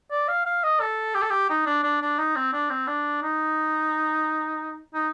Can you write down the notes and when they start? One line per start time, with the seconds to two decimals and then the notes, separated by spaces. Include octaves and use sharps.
0.11 D5
0.28 F5
0.46 F5
0.64 D#5
0.80 A4
1.15 G4
1.22 A4
1.30 G4
1.50 D#4
1.66 D4
1.83 D4
2.01 D4
2.18 D#4
2.36 C4
2.53 D4
2.70 C4
2.87 D4
3.22 D#4
4.94 D#4